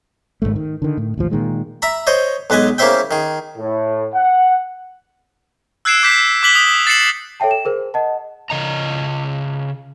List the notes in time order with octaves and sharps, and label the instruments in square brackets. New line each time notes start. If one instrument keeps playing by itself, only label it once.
[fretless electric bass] G#1 C#2 G#2 A3
D#3
D3 D#3
A2
A1 D#2 F3
A#2 D#3 G#3
[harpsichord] E5 A#5 B5
C5 C#5 D#5
B1 G#3 B4 D#5 G#5
C#3 A#3 E4 C5 E5 G5
D#3 G#4
[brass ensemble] A2
F#5
[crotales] E6 F#6 G#6 C7 D7 E7
D6 G6 B6
D6 F#6 B6 F#7 G7
D#6
A6 C7 C#7 E7 F#7
[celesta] A4 C#5 E5 G5 A5
E7
G#4 A#4 C5
D#5 F#5 A5
[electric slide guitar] C#3 D#5 A#5